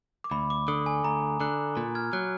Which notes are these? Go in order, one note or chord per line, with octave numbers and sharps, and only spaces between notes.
D6
D2 B5
D6
D3 D#6
G#5
D2 A#5
D3 F#6
A#2
F6 G#6
F#3 F#6